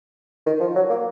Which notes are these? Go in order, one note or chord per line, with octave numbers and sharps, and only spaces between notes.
D#3
F3
F#3
A#3